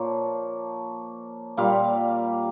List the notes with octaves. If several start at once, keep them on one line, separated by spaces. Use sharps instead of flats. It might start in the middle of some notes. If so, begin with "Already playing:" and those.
Already playing: A#2 F3 A#3 C#5
A#2 G3 A#3 F5